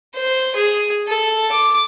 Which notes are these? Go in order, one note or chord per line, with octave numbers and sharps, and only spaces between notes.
C5
G#4
A4
D6